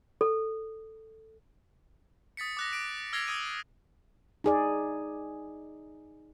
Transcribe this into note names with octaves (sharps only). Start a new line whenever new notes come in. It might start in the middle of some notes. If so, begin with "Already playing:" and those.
A4
D#6 A6 B6 C#7
D6 F#6 A#6
D6 B6 D7 E7
E6 F6 G#6 A#6 C7 F7
D#6 G#6 D#7
D#4 G#4 D5